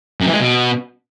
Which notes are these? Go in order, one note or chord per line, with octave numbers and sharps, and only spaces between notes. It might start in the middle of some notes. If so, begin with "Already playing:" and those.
F#2
E3
G#3
B2